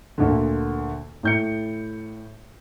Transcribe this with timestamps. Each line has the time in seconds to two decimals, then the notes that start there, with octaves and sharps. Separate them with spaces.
0.18 D2 A#2 D3
1.23 A2 G6 C#7